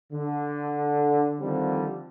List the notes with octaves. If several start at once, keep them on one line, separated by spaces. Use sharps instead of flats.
D3
D3 D#3 F3 G3 C4